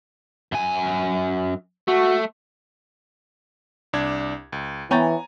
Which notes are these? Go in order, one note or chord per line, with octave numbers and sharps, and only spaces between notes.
F#2 G#5
A3 F#4
C2 D4 G#6
C#2
E3 B3 C#5 G5 G#5 A#5 A6